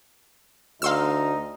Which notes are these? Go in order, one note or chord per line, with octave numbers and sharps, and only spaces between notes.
D2 D#4 F5 C6 E6